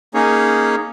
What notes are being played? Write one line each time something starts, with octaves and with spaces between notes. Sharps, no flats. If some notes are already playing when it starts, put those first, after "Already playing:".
A#3 C#4 D#4 G#4 C#5